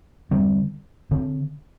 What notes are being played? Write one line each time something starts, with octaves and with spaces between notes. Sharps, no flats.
D3 G3 C4
D3 C4